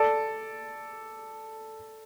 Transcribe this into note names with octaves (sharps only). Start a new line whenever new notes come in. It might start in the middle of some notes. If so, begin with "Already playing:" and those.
Already playing: A4 D5